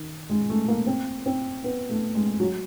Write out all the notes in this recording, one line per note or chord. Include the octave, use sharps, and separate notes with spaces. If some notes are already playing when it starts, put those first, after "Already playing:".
Already playing: D#3
G#3
A3
A#3
C4
C4
B3
A3
G#3
F#3